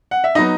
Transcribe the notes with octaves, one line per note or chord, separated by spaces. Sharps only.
F#5
E5
F#3 B3 D#4 D#5